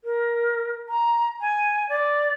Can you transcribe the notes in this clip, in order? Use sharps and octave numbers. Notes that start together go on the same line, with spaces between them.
A#4
A#5
G#5
D5